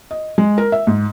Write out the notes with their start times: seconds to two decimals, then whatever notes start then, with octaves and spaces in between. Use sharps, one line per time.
0.11 D#5
0.38 G#3
0.58 A#4
0.72 E5
0.87 G#2